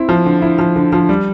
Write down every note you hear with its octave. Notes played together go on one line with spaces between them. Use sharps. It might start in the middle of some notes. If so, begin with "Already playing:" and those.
Already playing: C4 E4
F3
D3
E4
F3
D3
F3
G3